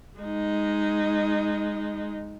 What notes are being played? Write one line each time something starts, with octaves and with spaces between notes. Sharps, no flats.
G#3 D#4